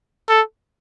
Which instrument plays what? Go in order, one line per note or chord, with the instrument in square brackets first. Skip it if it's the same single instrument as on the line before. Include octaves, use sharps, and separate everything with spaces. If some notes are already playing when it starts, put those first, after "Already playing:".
[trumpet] A4